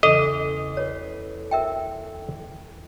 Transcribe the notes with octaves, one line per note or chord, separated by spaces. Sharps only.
E2 C#3 A4 D#5
B4 C#5 C7
A#4 E5 G5